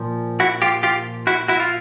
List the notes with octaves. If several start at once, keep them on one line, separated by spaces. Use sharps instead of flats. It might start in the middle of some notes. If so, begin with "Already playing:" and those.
Already playing: A#2 F3
E4 F#4
F4 G4
F4 G4
E4 F#4
E4 F#4
F4